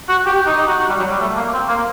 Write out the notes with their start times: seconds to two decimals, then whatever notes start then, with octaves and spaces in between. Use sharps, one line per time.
0.09 F#4
0.26 G4
0.36 G4
0.46 D#4
0.58 D#4
0.68 F#4
0.78 F#4
0.89 G3
0.99 F#3
1.11 G3
1.21 A3
1.37 A#3
1.53 C4
1.69 A#3